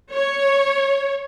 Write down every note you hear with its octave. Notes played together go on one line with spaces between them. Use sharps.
C#5